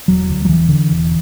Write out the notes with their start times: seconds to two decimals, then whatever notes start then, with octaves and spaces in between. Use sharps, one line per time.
0.08 E1 F#3
0.29 D2
0.45 F#3
0.49 E1 E3
0.69 D3
0.90 E1